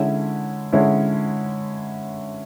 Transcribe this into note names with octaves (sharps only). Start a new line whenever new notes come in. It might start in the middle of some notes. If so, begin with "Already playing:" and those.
Already playing: D3 G#3 C#4 E4
D3 G#3 C#4 E4